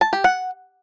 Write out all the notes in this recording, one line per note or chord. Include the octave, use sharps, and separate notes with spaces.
A5
G4
F#5